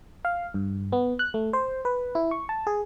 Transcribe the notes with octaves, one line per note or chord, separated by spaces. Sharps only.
F5
G2
B3
F#6
A3
C5
B4
E4
C#6
A5
G#4